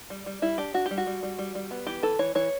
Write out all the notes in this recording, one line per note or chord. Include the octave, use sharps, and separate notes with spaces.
G3
G3
G3 E4
D4 G4
D4 F#4
G3 G4
F#4
G3
G3
G3
G3
B3
E3 G4
E3 A4
E3 C#5
E3 C#5